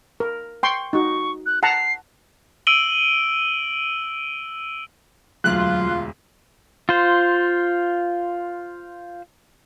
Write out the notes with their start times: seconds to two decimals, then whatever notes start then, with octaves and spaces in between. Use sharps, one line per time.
0.20 A#4
0.63 G5 C6 C#6
0.93 D#4 F#4 C#6
1.46 F#6
1.63 F#5 A5 A#5 C7
2.67 E6 D7 D#7 F#7 G7
5.44 E1 D2 F#3 F4 F#6
6.89 F4 C5